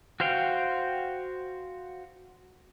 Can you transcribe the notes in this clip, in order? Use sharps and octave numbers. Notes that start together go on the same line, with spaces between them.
F#4 C5 F5 G5